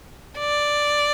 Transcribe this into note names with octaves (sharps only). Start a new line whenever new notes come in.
D5